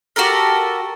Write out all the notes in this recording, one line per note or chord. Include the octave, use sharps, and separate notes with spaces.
F#4 G4 A4 A#4